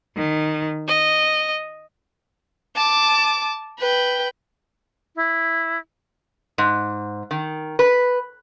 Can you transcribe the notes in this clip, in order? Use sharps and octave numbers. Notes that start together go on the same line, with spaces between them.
D#3
D#5
A5 D6
B4 G5
E4
G#2
D#3
B4